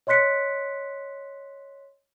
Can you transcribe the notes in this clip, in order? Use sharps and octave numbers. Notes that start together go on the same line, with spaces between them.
C#5 D#5 C6 F#6 B6 C#7